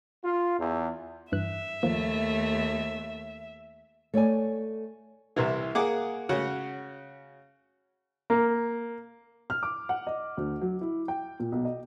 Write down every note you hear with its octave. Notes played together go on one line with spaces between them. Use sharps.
F4
E2
G2 E3 E5 F#6
D#2 D#3 F3 A3 A#3
A3 C#5 D5 G#5
C2 C3 E3
A#3 G#4 F#5 D6
C#3 C#4 F#4 F#5
A#3
F6
D6
F#5
D#5
D2
F#3
E4
G5
A#2
B1
D#5